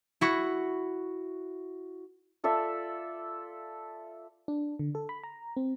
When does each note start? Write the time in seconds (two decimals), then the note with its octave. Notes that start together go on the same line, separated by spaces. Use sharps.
0.21 E4 F#4 C#6
2.44 F4 A4 D5 E5
4.48 D4
4.79 D3
4.95 A4
5.09 B5
5.23 A#5
5.57 C4